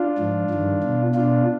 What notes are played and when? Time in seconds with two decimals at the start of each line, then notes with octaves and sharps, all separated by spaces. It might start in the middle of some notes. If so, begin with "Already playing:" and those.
Already playing: D4 F4
0.19 G#2 F3
0.50 G2 D#3
0.84 B2
1.15 B2 D4 F4